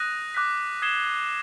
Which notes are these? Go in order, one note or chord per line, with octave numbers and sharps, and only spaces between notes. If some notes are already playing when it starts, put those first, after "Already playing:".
Already playing: D#6 F#6 A#6 D#7
D6 F#6 B6
D#6 G#6 C7 E7 G7